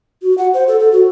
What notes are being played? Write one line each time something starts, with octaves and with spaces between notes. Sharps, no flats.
F#4
F#5
C5
A4
A4
F#4